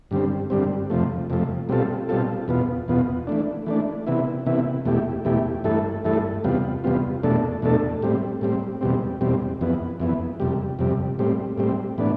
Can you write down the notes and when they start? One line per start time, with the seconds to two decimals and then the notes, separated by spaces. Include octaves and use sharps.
0.11 G2 D3 G3 C4
0.50 G2 D3 G3 C4
0.90 F2 C3 F3 A3
1.30 F2 C3 F3 A3
1.69 B2 G3 C4 F4 A4
2.09 B2 G3 C4 F4 A4
2.48 E2 B2 B3 F4
2.88 E2 B2 B3 F4
3.27 E3 A3 D4
3.66 E3 A3 D4
4.07 C3 E3 B3 E4
4.46 C3 E3 B3 E4
4.85 E2 B2 A3 E4 G4
5.25 E2 B2 A3 E4 G4
5.64 G2 E3 A3 E4 A4
6.04 G2 E3 A3 E4 A4
6.44 E2 C3 G3 B3 F4
6.84 E2 C3 G3 B3 F4
7.23 E2 B2 A3 D4 A4
7.62 E2 B2 A3 D4 A4
8.02 A2 G3 C4
8.41 A2 G3 C4
8.81 E2 B2 G3 C4
9.21 E2 B2 G3 C4
9.61 F2 E3 B3
10.00 F2 E3 B3
10.40 F2 C3 G3
10.79 F2 C3 G3
11.19 A2 G3 C4
11.58 A2 G3 C4
11.98 A2 E3 B3 D4